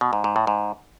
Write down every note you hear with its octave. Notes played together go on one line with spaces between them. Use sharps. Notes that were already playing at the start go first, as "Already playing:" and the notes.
B2
G#2
G#2
A2
G#2